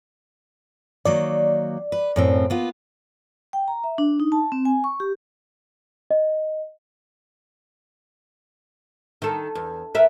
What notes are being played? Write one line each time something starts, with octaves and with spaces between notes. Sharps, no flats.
D#3 F#3 A#3 D5
B4
F#2 A2 C4
A#3 B3 F4
G5
A#5
E5
D4
D#4
A5
C4
G#5
C#6
G4
D#5
D#3 A4
E2
B3 A#4 E5